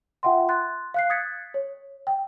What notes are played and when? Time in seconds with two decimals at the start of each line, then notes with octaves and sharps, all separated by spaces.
0.23 F4 E5 F#5 G5 C6
0.49 C6 F#6 A6
0.94 F5 F#6 C7
1.10 D#6 F#6 G#6 A6 B6 C#7
1.54 C#5
2.07 G5